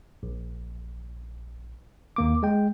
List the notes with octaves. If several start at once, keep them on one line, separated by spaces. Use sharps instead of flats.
A#1
D#2 A#3 D6
G#3 G5